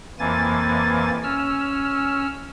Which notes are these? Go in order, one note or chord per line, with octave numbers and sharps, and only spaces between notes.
F2 E3 A#3 G#5 A6
C#4 E6 F6